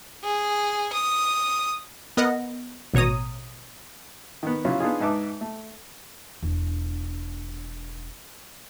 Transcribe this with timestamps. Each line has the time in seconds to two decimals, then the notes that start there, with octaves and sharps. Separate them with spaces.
0.24 G#4
0.93 D#6
2.17 B3 A#4 D#5 F#5
2.94 A1 B2 C#5 A#5 D#6
4.43 D#3 B3
4.65 C#3 F#3 C#4 E4 F4
4.80 B3 D4 D#4 F4 G#4
5.00 G#2 D#4 B4 E5 A5 D6
5.41 A3
6.42 E1 D4